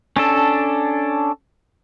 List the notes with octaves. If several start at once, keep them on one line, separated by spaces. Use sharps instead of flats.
C#4 D4 A4